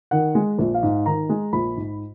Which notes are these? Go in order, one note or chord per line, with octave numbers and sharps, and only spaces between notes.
D#3 F#5
G#3
A#1
F5
G#2
D#3 A#5
G#3
A#1 B5
G#2